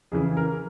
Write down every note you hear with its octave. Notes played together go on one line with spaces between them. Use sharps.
F2 C#3 E3 G#4
A#4